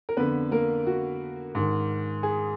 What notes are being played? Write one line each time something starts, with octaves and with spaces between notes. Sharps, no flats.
A#4
F2 D3 B3 B4
A#3 A#4
F#4
G#2 D#3
G#4